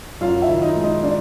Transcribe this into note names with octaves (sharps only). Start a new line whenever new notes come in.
F#2 F4 F5
E4 E5
D#3
D#4 D#5
G#3
D#4 D#5
D4 D5